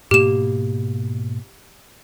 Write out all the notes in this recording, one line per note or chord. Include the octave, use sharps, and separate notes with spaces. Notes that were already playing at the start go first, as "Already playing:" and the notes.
G#2 B2 A#3 G4 E7